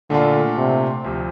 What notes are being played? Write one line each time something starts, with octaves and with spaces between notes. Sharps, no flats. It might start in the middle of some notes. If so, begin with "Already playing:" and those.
A#2 D3 A3 D4 F4
C3
D2 C3 F3